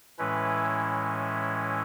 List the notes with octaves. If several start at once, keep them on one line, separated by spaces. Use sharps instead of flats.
A2 E3 G#3 C#4 E4 B4